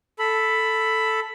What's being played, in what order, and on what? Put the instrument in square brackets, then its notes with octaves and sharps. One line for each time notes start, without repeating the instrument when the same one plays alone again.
[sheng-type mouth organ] A4 B5